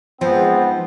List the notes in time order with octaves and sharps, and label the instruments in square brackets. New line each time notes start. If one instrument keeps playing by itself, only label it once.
[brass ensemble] G#2 B3 [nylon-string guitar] F3 [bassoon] C4